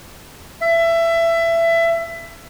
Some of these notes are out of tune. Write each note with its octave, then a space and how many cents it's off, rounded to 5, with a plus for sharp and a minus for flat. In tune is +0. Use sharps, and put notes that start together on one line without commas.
E5 +20